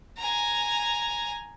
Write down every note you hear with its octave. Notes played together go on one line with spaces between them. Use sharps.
G#5 A#5